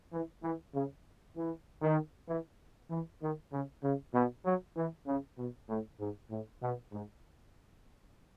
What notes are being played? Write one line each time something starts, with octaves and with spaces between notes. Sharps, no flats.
E3
E3
C#3
E3
D#3
E3
E3
D#3
C#3
C#3
B2
F#3
E3
C#3
B2
A2
G#2
A2
B2
G#2